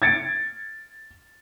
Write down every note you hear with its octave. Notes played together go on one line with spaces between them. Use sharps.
G#6 A6 C#7 D7